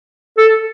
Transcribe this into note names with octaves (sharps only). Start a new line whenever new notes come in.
A4